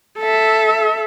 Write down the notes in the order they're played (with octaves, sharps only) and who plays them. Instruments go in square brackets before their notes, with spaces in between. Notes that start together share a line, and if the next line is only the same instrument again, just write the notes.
[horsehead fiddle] A4 E5